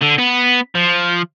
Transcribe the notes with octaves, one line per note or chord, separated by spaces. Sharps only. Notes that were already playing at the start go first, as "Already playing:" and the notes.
D3
B3
F3